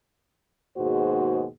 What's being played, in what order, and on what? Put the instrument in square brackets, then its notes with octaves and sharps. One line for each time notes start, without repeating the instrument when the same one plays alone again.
[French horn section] D#2 G#2 B2 F#4 G#4 C5